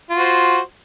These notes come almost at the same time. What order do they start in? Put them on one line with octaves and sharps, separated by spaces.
F4 F#4 C5